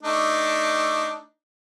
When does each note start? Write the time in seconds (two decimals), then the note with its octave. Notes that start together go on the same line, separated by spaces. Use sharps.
0.03 A3 D4 D#4